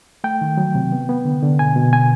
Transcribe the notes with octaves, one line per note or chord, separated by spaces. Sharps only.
A3 G5
D#3
F#3
C3
B3
B3
D3
D3
B2 G#5
B2
B3 G#5